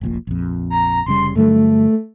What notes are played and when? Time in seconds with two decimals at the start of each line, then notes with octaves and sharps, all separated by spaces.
0.01 F1 A#1 A#2
0.27 A#1 F2
0.70 A#5
1.06 F1 C#3 G3 C6
1.35 G2 D3 F#3 A3